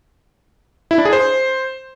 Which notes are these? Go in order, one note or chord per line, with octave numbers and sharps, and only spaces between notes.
E4
D4
G#4
C5